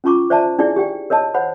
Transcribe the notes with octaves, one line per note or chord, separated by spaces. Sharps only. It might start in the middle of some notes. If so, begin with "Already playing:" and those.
C#4 F4 A#5 C#6 D6
C5 D5 E5 A5 A#5
D4 E4 G#4 D5
G4 D5 G5
A#4 C#5 D#5 A5
C5 C#5 F#5 B5